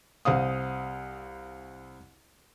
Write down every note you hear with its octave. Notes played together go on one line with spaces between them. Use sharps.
C2 C4 F5 D#6